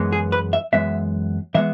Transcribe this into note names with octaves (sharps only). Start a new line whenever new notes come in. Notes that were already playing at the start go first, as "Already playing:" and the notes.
Already playing: F#2 E3 G#3 B3
G#4
B4
E5
F#2 E3 G#3 B3 E5
E3 G#3 B3 E5